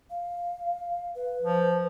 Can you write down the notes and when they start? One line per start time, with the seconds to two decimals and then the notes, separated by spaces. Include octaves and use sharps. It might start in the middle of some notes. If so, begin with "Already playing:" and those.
0.10 F5
1.15 B4
1.43 F3